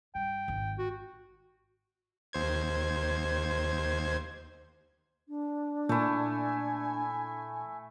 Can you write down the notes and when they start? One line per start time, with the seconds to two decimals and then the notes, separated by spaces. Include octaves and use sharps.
0.15 G2 G5
0.48 G#1
0.78 F#4
2.33 D#2 C5 G#6
5.28 D4
5.89 A#2 A3 E4 G#5